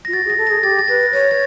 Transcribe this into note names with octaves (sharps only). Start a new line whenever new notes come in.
F4 A#6
F#4 A6
G#4
A#6
A4
A#6
G#4
G4 A6
A6
B4 A#6
C#5 A6
A6